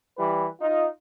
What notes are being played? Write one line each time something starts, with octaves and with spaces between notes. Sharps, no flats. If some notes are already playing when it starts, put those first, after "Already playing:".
E3 G3 E4 B4
D#4 F4